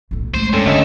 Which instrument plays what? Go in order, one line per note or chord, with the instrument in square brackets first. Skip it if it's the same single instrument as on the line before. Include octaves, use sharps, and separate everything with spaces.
[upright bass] B1 A2
[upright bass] G#3 A3 [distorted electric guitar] C5
[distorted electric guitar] G2 [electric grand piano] C#4 A4
[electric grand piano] D2 C#4 D#5 [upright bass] D3 [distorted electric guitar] A3 E5